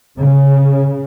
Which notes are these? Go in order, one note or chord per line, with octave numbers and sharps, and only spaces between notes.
C#3